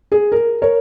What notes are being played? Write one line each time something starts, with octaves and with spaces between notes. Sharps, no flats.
G#4
A#4
A#4 C#5